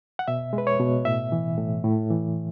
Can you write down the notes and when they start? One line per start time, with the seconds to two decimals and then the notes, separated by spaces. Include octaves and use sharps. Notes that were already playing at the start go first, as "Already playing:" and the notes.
0.19 F#5
0.28 B2 E5
0.53 G#3
0.58 B4
0.67 C#5
0.80 B2
1.05 A2 E5
1.32 E3
1.58 A2
1.84 A2
2.10 E3